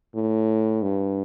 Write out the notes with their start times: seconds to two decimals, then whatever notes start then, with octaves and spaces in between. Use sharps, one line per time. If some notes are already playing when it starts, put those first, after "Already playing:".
0.15 A2
0.82 G2